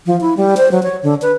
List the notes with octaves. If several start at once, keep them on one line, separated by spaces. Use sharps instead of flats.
F3
E4
G3
C5
F#3
C#5
D3
B4